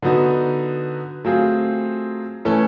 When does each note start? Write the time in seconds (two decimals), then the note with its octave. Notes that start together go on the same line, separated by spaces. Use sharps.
0.02 D3 F#3 B3 D#4 F#4
1.25 F#3 A3 C4 F4 G#4
2.45 E3 A3 C#4 E4 A4